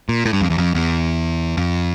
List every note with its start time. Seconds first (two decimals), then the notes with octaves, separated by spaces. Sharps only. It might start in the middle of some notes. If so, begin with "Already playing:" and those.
0.09 A#2
0.26 A2
0.33 G2
0.41 F2
0.50 E2
0.58 F2
0.75 E2
1.57 F2